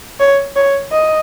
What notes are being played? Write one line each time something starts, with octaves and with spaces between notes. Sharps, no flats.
C#5
C#5
D#5